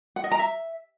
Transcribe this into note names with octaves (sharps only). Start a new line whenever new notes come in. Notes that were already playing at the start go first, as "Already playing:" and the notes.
F#5
D#5
A#5
E5